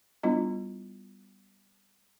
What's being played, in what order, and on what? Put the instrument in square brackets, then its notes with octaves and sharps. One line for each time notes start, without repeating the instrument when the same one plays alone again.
[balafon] G3 B3 D4 E4 F4 D#5